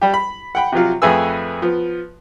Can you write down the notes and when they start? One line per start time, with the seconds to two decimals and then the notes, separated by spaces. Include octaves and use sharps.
0.02 G3 G4
0.14 B5
0.55 F#5 G5 B5
0.72 C3 F3 F#3 F4
1.02 F2 A3 G#4 B4 G#5 E6
1.62 F3 B3